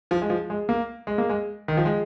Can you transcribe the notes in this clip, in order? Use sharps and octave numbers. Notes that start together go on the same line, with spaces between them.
F3
G#3
F3
G#3
A#3
G#3
A#3
G#3
D#3
F3
G#3